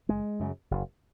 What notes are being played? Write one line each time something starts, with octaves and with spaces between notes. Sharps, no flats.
F#1 G#3
F#2 C#3
F#1